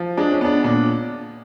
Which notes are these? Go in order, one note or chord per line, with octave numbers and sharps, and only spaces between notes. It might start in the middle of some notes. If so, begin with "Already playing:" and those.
Already playing: F3
G#3 D4
C#4
B3 D4
A#2 D4